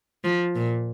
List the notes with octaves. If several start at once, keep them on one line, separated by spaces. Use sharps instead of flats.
F3
A#2